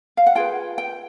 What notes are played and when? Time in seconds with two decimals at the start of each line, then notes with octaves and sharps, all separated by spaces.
0.17 F5
0.27 F#5
0.35 F4 G#4 B4 G5
0.78 G5